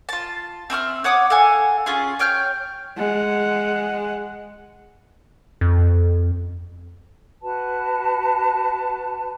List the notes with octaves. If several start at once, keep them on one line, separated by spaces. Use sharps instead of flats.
F4 A5
C4 E5 C#6 F6
C#5 F#5 D6 D#6
A4 F5 F#5 G#5
C#4 F4 G#4 C6
C#5 G5 F6 G6
G#3 F#5
F2
F#4 B4 A5